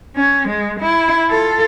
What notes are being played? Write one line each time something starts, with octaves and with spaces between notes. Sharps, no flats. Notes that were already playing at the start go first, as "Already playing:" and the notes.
C#4
G#3
E4
F4 A4